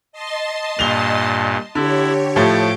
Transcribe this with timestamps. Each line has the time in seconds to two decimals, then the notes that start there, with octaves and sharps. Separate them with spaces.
0.12 D#5 A5 C6
0.79 G2 A#2 F7 G7
1.75 D3 E4 G4 C#5
2.36 A2 F3 A3 D6